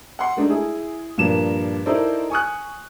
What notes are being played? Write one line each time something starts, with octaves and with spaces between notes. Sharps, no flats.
F#5 C6
G#3 A3 D4 D#4
E4 G#4
G2 A#2 F3 A#4 E7
D#4 E4 A4 A#4 C5 D5
G#5 C#6 D#6 F#6